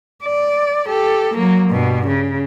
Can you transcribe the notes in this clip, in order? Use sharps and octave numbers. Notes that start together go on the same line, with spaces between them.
D5
G4 A4
F#3 A#3
G2 B2
C#3